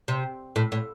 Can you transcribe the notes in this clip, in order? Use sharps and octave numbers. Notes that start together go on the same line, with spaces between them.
C3
A2
A2